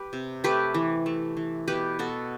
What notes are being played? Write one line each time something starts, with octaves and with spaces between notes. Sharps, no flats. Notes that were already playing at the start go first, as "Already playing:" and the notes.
Already playing: G4 B4
C3
A3 G4 B4
E3
A3
E3
B2 G4 B4
B2 F#4 A4